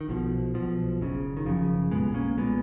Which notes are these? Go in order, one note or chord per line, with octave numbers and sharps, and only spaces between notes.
D#3
B1 B2 F3
B1 B2 F3
F#1 F#2 C#3
D#3
F#1 F#2 C#3 F3
B1 A#2 G#3 B3
A#3 C#4
B1 A#2 G#3 B3